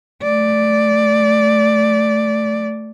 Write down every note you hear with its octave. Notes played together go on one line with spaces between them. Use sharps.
A3 D5